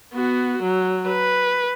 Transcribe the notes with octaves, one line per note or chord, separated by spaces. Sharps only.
B3 F#4
F#3
B4